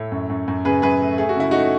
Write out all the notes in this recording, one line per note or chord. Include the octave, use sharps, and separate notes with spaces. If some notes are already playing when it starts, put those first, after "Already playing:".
Already playing: A2 A4 C#5
F#2
F#2
F#2
C#3 G#4 B4
F#2 G#4 B4
A3
A3 G#4
F#4
C#3 E4
A3 D#4 F#4